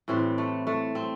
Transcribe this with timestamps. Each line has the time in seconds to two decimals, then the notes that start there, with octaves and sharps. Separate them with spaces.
0.08 A2 E3 G3 C4
0.38 A3
0.67 A3
0.95 C4